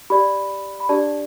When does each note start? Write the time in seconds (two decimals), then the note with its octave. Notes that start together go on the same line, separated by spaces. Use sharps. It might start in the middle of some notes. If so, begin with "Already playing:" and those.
0.10 G4 D5 B5
0.80 B5
0.89 D4 G4 D5 A5